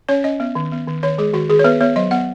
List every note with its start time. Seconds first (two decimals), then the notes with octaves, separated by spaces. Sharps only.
0.09 C#4 C#5
0.24 C#4 D#5
0.40 B3
0.55 D#3
0.72 B3
0.87 D#3
1.03 D#3 C#5
1.18 G#3 G#4
1.33 D#3 F#4
1.50 D#3 G#4
1.59 C#5
1.64 B3 B4
1.81 B3 C#5
1.96 F#3 D#5
2.11 B3 F#5